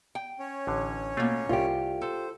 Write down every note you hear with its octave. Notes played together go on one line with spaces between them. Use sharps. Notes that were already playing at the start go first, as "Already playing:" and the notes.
G5
C#4 C#5
A1 D3
B2 A3 A#3 F4
C2 F4 G4
A4 C5